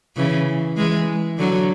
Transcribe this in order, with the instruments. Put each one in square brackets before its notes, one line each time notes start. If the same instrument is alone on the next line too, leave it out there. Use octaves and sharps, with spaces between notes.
[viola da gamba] C#3 E3
E3 G#3
D3 F#3